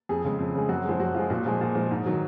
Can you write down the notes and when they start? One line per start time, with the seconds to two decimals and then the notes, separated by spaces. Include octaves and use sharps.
0.09 F2 G#4
0.24 C#3 G#3
0.39 F2
0.55 C#3 G#3
0.69 F#2 F#4
0.85 F3 G#3
0.99 F#2 F#4
1.14 F3 G#3 F4
1.30 A#2 F#4
1.46 F3 G#3
1.61 A#2
1.75 F3 G#3
1.91 G#2
2.06 D#3 F#3